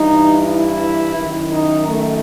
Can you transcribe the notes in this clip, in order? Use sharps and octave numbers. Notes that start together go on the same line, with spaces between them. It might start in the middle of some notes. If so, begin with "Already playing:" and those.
Already playing: G2 E3 D#4
E4
F#2 D#3
D#4
A3